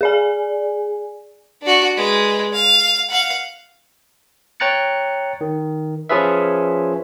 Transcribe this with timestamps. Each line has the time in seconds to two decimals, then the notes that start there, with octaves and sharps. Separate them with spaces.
0.01 G#4 D5 G#5
1.62 D4 F#4
1.96 G#3 B4
2.52 F5
3.10 F5 F#5
4.60 C#5 G5 A#5 F#6 A6 C#7
5.41 D#3
6.09 F3 C#4 F4 G#4 B4 E5